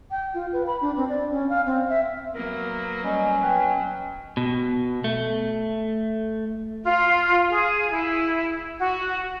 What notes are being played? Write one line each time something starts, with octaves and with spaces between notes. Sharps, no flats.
G5
F4
B4
B5
D4
C4
D5
C#4
F5
C4
E5
F#3 A#3 B3 A#4
G3 C#4 D#5
F#3 B4 G5
B2
A3
F4
G#4
E4
F#4